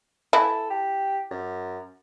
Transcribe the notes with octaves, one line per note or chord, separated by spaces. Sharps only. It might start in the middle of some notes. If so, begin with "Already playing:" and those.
E3 E4 A4
G4
F#2